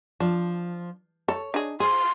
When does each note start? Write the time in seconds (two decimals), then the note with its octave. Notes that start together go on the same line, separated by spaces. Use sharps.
0.20 F3 D4
1.28 A4 C#5
1.54 D4 D#4 G#4
1.80 G#4 C5 C6